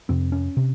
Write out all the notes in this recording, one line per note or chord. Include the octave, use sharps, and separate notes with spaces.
F2 C3 C4
C#4
C3